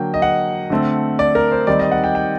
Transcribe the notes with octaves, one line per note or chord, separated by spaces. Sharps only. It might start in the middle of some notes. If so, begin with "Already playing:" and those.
Already playing: D3 F#3 A#3 G5
D#5
F#5
D3 A3 C4
D5
A#4
C5
D#3 G3 C4 D#4 D5
D#5
F#5
G5
G5